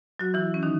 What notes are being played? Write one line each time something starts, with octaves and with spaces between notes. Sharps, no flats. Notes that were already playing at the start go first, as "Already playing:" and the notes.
F#3 F#4
E3 E4
C#4
D#3 D#4